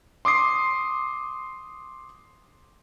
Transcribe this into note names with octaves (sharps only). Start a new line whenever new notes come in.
C6 D6 D#6 C7